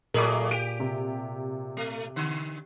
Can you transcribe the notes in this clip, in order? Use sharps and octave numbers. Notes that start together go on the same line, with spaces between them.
A#2 F#3 A3 G#4 A#4 D#5 D6
G4 D7 D#7
C3
A3
D3